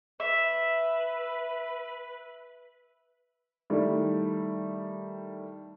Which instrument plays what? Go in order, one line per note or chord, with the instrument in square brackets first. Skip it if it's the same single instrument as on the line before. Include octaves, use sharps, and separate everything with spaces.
[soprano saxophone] B4 [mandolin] E5
[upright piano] D#3 G3 A3 E4